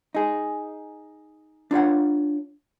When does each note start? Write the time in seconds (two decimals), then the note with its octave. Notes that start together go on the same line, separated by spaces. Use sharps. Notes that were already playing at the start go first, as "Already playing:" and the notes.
0.15 D#4 G#4
1.71 D4 F4 C#5 F#5